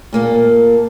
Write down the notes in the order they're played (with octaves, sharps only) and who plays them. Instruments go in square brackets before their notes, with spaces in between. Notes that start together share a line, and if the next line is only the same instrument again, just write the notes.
[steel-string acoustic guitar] A#2 A#3 A4